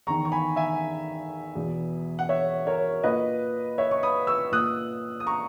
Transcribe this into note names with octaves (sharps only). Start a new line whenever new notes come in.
E2 D#3 A#5 C#6
C#6
G#5 B5
E5 G#5
E2 B2
F#5
C#5 E5
A#4 C#5
A#2 B4 D#5
C#5 E5
C#6
B5 D#6
C#6 E6
A#2 D#6 F#6
D#6
A#5 C#6